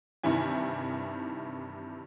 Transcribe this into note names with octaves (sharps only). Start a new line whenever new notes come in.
G2 C3 D#3 E3 E4 G#5